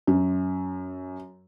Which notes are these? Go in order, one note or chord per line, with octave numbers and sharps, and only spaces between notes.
F#2